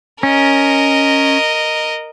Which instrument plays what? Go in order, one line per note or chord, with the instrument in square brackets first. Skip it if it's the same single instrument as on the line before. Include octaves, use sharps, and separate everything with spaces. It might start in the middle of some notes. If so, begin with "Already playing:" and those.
[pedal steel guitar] C#4 [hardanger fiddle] A#4 D#5